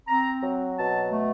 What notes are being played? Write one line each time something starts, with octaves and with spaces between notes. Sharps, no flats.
C4 A#5
F#3
B2 A5
A3